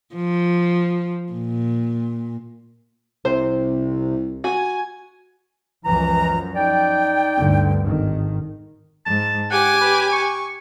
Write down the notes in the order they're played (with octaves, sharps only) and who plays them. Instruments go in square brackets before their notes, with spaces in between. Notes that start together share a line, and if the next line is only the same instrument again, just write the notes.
[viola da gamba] F3
A#2
[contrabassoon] C2 [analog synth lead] C3 [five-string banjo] C5
[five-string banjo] F#4 [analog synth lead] G#5
[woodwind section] C#2 E3 A#5 [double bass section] F#2 F3
[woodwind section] D#4 D5 G5
[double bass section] D2 G2 D3
G#1 D#3
[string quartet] G#2 [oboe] A5
[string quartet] G4 G#5 D6 [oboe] F#5
[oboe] B4
C#6